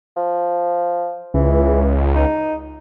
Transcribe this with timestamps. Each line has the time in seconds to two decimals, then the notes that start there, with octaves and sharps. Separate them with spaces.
0.16 F3
1.34 C#2 E3
2.15 D#4